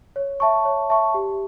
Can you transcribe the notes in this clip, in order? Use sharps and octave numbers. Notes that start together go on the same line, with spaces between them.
C#5
E5 A5 C#6
C#5
E5 A5 C#6
G4